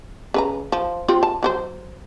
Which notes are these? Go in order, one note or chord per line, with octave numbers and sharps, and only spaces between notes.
C#3 B4 A#5
F3
C4 F4 G4
A5
F#3 F#4 C5